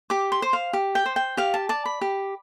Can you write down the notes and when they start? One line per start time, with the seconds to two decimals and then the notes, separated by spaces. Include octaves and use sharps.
0.10 G4 D6
0.32 C6
0.42 C5
0.53 F5
0.73 G4
0.95 G5
1.06 C5
1.16 G5
1.37 G4 F5
1.54 A5
1.69 D5 A5
1.85 B5
2.01 G4